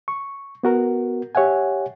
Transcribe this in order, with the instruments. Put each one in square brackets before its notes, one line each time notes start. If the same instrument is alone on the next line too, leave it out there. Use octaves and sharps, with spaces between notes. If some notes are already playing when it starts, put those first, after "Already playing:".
[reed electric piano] C#6
B3 F#4 A#4
G4 C#5 E5 F#5 G#5